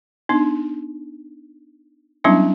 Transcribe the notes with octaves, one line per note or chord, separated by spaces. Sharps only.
B3 D4 D#4
F#3 G3 B3 C#4 D4 E4